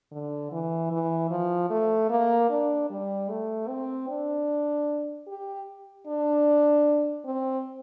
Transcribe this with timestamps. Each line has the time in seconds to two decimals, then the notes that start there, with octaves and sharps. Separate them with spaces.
0.12 D3
0.52 E3
0.91 E3
1.31 F3
1.70 A3
2.10 A#3
2.50 D4
2.90 G3
3.30 A3
3.68 C4
4.09 D4
5.28 G4
6.07 D4
7.25 C4